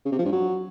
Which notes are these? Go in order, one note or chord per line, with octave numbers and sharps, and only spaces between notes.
C#3
C3
F3
G2
F#3